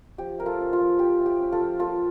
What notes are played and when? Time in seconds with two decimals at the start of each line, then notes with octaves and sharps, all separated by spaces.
0.18 F3 G4
0.38 A3 A#4
0.46 F4 A4
0.59 C#4
0.73 F4
0.79 F3
0.99 F3 G4
1.19 A3
1.26 G4
1.40 C#4
1.52 F4 A4
1.60 F3
1.80 A#3 F4 A4